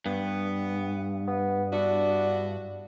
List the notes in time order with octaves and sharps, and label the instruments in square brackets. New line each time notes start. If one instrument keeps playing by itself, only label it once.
[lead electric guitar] G2 [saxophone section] B3
[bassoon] B3
[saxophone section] B3 E4 F#4 [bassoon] D4